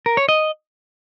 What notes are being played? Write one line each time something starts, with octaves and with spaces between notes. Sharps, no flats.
A#4
C#5
D#5